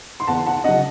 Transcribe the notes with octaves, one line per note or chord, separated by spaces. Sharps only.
C6
E2 F#5 A5
F#5 A5
C#3 F#3 D#5 F#5